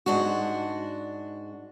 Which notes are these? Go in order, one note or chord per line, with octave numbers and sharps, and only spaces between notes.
G#2 D4 F#4